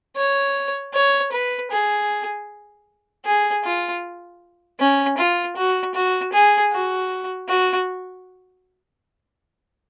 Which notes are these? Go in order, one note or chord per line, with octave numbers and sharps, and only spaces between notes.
C#5
C#5
B4
G#4
G#4
F4
C#4
F4
F#4
F#4
G#4
F#4
F#4